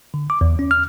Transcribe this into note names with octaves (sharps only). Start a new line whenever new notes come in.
D3
D6
E2
C#4
F6